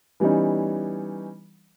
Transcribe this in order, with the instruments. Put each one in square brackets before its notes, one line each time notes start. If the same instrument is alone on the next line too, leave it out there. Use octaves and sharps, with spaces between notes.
[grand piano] E3 G3 B3 C#4 D#4